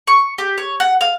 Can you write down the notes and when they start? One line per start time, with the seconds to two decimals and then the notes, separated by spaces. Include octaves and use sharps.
0.07 C#6
0.38 G4
0.58 C#5
0.80 F#5
1.01 F5